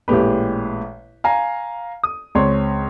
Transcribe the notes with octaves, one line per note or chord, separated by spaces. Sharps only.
A1 A#2 G#3 G4 B4
F5 G#5 A#5
D#6
C#2 C4 C#5 C6